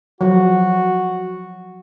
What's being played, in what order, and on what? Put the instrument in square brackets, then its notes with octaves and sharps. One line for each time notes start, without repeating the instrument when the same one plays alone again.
[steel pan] F3 F#3 [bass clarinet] F#4